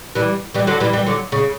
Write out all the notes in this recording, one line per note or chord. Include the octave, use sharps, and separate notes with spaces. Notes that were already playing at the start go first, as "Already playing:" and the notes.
E3 G3
E3 G3
D3 F#3
E3 G3
E3 G3
D3 F#3
C#3